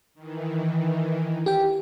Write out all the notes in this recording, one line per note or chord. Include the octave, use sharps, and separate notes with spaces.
D#3 E3
G4 G5